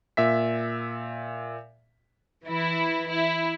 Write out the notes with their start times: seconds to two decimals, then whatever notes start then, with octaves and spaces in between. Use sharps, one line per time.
0.17 A#2 E5 B6
2.45 E3 E4
3.10 E4